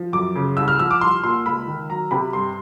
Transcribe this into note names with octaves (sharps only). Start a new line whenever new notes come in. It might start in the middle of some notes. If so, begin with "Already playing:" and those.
Already playing: F3
F#2 D6
C#3
C2 E6
F6
F3 E6
D6
C2 C6
A#2 C6
C#2 B5
D#3
F#3 A#5
C3 B5
G2 C6